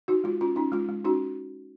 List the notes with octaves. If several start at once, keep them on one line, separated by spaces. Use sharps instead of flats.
D#4 F#4
G#3 F4
C#4 F4
C#4 D#4
G#3 F4
G#3
C#4 D#4 F#4